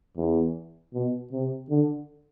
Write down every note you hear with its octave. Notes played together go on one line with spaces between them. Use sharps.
E2
B2
C3
D3